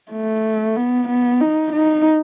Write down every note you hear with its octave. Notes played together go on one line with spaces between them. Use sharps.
A3
B3
B3
D#4
D#4